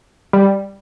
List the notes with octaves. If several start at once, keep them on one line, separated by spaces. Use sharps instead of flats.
G3